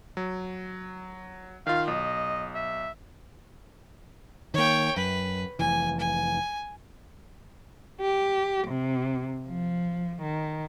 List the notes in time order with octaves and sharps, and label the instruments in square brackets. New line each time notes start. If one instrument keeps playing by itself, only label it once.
[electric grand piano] F#3
[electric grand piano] D#3 F4 [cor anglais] F5
[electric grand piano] B1 [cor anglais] D#5
[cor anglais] E5
[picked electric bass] D#3 A#3 [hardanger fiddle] C#5 G5
[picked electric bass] F#2 [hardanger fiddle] B4
[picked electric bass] F1 E3 [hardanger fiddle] G#5
[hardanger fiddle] G#5
[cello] G4
C3
F3
D#3